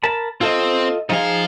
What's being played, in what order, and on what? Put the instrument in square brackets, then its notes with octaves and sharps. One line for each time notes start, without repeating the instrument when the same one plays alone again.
[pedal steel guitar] A#4 A5 B5
[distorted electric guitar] C4 [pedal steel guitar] F4 A4 D#5
[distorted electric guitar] F3 F5 [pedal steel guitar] D#4 G#4